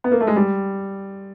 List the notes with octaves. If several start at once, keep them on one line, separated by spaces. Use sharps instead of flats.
B3
A#3
A3
G#3
G3